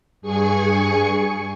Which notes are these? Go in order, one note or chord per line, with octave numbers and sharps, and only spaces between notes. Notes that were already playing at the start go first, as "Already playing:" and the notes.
G2 G#4 G#5 C#6 C#7